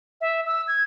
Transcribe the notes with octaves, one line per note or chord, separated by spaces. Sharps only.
E5
E6
G#6